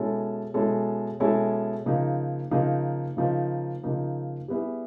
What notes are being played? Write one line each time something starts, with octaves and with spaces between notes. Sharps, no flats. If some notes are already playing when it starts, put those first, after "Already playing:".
Already playing: B2 G#3 C#4 E4 A4
B2 G#3 C#4 E4 A4
B2 G#3 C#4 E4 A4
C#3 F3 A#3 D#4
C#3 F3 A#3 D#4
C#3 F3 A#3 D#4
C#3 F3 A#3 D#4
G3 B3 E4 G#4